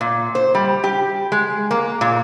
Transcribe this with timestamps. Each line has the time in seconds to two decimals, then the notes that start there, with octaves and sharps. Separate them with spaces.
0.01 A#2
0.35 C5
0.55 G3
0.84 G4
1.32 G#3
1.71 A#3
2.01 A#2